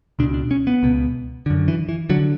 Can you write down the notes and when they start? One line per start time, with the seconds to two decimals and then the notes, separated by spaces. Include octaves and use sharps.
0.19 C#2 B2 D4
0.34 D4
0.51 C#4
0.67 B3
0.83 C#2 B2
1.46 F#2 D3
1.68 E3
1.89 E3
2.09 D3 F#3